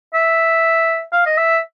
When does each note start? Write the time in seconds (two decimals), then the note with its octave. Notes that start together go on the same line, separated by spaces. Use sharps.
0.14 E5
1.13 F5
1.26 D#5
1.37 E5